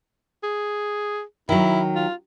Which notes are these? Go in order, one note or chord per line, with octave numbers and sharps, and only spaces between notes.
G#4
D#3 F#3 E4
F4